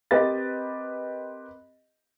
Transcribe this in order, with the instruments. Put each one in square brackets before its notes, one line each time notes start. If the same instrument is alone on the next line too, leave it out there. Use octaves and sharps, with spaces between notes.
[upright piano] C4 G4 A#4 B4 D#5 A6